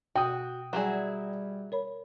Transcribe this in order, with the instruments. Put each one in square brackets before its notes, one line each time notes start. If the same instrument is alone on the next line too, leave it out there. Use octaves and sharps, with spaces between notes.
[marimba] B2 [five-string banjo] F#4 [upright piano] G5 D#6
[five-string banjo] F#3 E4 G#4 [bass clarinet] G3 [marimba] D5 F#5
[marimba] A#4 C#5 B5